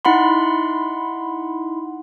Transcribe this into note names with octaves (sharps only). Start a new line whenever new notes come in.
D#4 E4 F#5 B5 C6